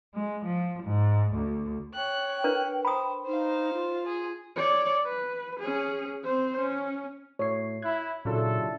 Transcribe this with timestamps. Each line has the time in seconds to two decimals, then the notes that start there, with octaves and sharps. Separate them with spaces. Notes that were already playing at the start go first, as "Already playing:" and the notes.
0.14 G#3
0.45 F3
0.83 G#2
1.34 D2
1.94 C#5 G5 F#6
2.44 D4 A#4 B4
2.85 C5 G5 B5 D#6
3.26 D#4 C5 F5
3.74 F4
4.06 G#4
4.56 C#5 D5
5.05 B4
5.60 C#4 G#4
6.24 C4 C5
6.59 C#4
7.39 A2 A3 C#5 C7
7.82 E4 F#6 G#6
8.25 A#2 C#3 F#3 D4 E4 F4 A4